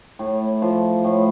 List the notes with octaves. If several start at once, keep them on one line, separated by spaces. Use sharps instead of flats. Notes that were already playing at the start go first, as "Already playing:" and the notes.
A2
F3
A2